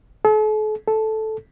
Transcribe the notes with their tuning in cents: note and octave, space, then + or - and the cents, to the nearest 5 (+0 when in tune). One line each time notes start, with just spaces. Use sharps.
A4 -45
A4 -10